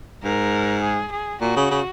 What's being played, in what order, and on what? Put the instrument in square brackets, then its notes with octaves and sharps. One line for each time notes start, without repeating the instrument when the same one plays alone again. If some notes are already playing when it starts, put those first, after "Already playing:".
[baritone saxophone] G#2 [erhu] A#4
[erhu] G#4
G#4
[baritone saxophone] A#2 [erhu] F#4
[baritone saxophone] C#3
C#3